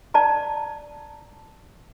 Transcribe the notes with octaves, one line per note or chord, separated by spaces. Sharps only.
D5 A5 A#5